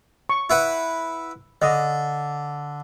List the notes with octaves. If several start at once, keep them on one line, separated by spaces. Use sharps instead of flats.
C#6
E4 B4 F#5
D3 D#5